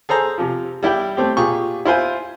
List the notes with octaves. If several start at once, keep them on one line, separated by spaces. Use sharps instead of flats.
G#4 A4 C5 A#5
C3 F3
G3 E4 G4 G5
A3 C4 G4
A#2 G4 G#4 C#6
E4 F4 C5 G#5